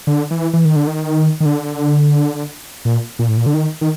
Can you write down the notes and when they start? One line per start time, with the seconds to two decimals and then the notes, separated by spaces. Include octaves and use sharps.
0.07 D3
0.31 E3
0.53 E3
0.65 D#3
0.76 D3
0.87 D#3
1.40 D#3
1.45 D3
2.85 A#2
3.19 A#2
3.28 A2
3.37 A#2
3.46 D3
3.54 D#3
3.81 D#3